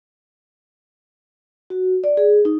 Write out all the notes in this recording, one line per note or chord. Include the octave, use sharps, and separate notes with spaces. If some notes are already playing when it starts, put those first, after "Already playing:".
F#4
D5
G#4
D#4